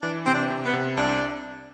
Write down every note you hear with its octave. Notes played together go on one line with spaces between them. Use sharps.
E3 D4
C3 C4
D4
C3
B3
C3
C2 D4